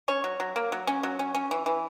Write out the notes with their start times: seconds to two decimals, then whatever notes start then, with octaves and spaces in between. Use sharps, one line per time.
0.08 C#4 C#5
0.24 F#3
0.40 F#3
0.56 A#3
0.72 F#3
0.87 C#4
1.03 F#3
1.19 C#4
1.34 C#4
1.51 E3
1.66 E3